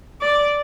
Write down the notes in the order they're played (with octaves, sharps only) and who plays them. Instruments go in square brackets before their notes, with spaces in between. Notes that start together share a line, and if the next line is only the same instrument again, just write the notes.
[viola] D5